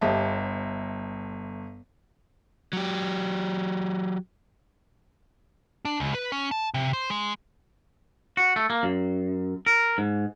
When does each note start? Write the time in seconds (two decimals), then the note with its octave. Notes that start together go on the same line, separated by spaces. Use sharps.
0.01 G1 G4 D#5 E5 A5
2.73 F#3 G4
5.85 D4
6.00 C#2
6.14 B4
6.32 C#4
6.51 A5
6.74 C3
6.93 C5
7.10 G#3
8.37 F#4
8.56 A3
8.70 A#3
8.83 F#2
9.66 A#4
9.98 G#2